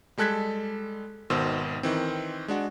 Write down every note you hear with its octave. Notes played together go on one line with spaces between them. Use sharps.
G3 G#3 A4 F#6 G#6 B6
G#1 B2 D#3 C5 E6
D#3 E3 C4
G#3 D4 F#4